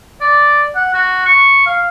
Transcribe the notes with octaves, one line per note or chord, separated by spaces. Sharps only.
D5
F#5
F#4
C#6
F5